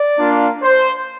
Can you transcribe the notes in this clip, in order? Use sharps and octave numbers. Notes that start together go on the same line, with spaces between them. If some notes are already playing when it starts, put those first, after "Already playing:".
Already playing: D5
A#3 D4 F4
C5